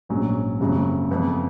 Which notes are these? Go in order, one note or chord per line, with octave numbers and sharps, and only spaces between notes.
A#1 G#2 F#3 C#4
F#1 F2 C#3 F#3
F#1 F2 F3 B3